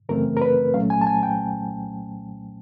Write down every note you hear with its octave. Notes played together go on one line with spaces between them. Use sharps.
F#2 C#3 E3 A3 C4 A#4
A#4
B4
C2 A#2 F#3 A3 C#4 F5
G#5
A5
G#5
G5